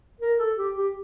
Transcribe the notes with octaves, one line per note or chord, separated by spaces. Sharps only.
A#4
A4
G4
G4